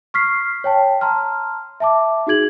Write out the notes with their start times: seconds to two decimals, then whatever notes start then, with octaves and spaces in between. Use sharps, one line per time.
0.14 C#6 F6 B6 C7
0.64 C#5 G5 A5
1.01 A5 A#5 C6 F6
1.80 E5 A5 D6
2.27 D#4 F#4 G#4 G#6 F#7